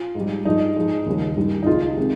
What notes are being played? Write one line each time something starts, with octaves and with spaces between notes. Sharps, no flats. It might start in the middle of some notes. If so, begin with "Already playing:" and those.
Already playing: F4
G#2
G3
G2 F3 G#3 D#4
G#2 F3 G#3
D#2 C#3 G3
G2 D#3 G3
D#4
C#2 C#3 G#3 F4
C3 D#3 G#3